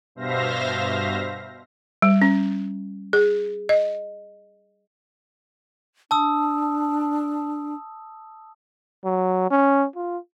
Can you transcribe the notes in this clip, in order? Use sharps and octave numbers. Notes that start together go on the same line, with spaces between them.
G2 B2 C5 E5 F5 A#6
G3
C#4
G#4
D#5
D4 A5 D#6 E6
F#3
C#4
F4